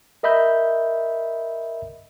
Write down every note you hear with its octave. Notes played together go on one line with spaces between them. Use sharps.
A#4 D#5 E5 B5 G6